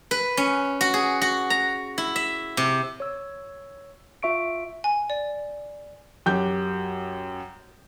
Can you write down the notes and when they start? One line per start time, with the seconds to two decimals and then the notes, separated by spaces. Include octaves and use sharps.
0.11 B4
0.37 C#4
0.81 F#4
0.94 G#4
1.22 F#4
1.50 A#5
1.98 E4
2.16 E5
2.57 C3
3.00 C#5 E6
4.23 F4 E5 C#6 D7
4.84 G#5
5.10 D5
6.26 F#2 G4 G6